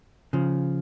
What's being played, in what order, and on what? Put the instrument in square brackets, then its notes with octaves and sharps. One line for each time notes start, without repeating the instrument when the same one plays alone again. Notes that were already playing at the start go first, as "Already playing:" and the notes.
[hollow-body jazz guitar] C#3 F3